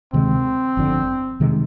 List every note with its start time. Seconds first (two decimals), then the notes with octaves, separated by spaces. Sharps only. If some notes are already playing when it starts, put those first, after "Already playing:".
0.13 D2 C3 D#3 G#3 C4
0.77 G1 F2 D3
1.40 F2 C3 D#3 G#3